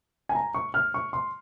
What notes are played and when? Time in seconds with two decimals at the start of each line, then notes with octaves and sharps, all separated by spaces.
0.29 G#5
0.35 A#5
0.54 C#6
0.74 F6
0.94 C#6
1.13 C6